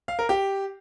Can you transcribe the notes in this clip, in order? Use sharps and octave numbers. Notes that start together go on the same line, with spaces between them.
F5
A#4
G4